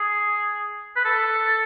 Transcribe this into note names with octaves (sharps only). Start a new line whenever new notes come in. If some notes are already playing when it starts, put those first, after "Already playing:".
Already playing: G#4
B4
A4